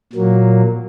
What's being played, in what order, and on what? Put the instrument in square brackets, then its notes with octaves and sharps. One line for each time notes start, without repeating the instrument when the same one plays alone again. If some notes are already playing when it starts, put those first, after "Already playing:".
[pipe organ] A#2 F#3 A#3